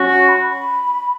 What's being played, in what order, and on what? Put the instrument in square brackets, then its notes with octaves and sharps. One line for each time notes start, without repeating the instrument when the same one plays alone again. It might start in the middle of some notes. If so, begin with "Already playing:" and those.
Already playing: [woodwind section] F#3 C#4 F#4
[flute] C#6
B5
B5